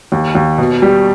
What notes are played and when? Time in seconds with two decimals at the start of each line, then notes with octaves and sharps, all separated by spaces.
0.12 D#2
0.35 D#2
0.58 B2
0.82 G3